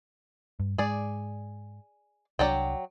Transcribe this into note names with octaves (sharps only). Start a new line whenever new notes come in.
G2
G#2 G#3 G#4 D5
C2 E3 F#3 D4 D5 G5